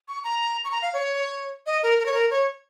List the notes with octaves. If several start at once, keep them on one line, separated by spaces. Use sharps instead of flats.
C#6
A#5
C#6
A#5
F5
C#5
D#5
A#4
A#4
C#5
A#4
C#5